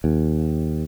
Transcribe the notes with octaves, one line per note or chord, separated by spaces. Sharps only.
D#2